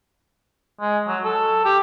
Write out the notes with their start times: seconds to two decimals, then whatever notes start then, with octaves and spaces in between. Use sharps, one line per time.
0.81 G#3
1.08 F#3
1.24 A4
1.65 G4